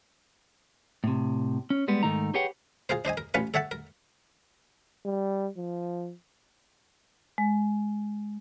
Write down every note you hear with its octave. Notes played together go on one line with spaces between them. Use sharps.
A2 C3
C#4
G3 G#3 B3
G#2 D#3 A3 D#4 A#5
G4 G#4 B4 C#5 F#5 G5
F4 G#4 A#4 C5
D4 C5 D#5 G#5
A#4
A1 C#4 F4 B4 C#6
A4 C#5 E5 F#5 A5
A#4
G3
F3
G#3